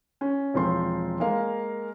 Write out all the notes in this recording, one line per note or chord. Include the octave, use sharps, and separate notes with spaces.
C#4
E1 F3 C4 C6
G#3 A#3 A#4 F5